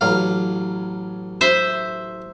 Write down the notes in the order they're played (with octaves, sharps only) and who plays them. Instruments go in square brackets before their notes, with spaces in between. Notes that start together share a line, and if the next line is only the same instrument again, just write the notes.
[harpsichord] A1 F#3 F5
[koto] C5 E5